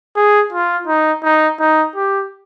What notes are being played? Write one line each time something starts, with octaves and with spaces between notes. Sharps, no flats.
G#4
F4
D#4
D#4
D#4
G4